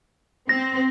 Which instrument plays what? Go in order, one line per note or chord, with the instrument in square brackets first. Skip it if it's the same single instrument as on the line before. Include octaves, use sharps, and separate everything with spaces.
[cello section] C4 [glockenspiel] A#6